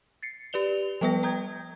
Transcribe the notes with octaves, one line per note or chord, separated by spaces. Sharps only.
A6 C7 C#7
G4 B4 D5 F7 G7
F3 G3 B3 B4 G5 A#6
G5 A#5 D#6 G6 G#6